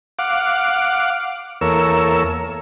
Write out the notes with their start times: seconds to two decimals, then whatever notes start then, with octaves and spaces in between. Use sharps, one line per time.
0.19 F5 F#5 D6
1.61 E2 A#3 A4 A#4 C#5 E6